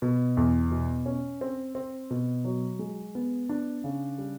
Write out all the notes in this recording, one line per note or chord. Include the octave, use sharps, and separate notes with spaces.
B2
E2
B2
C#4
C4
C4
B2
F#3
G#3
B3
D4
C#3
G3